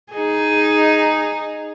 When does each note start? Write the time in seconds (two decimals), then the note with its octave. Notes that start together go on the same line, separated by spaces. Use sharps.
0.13 D#4 G#4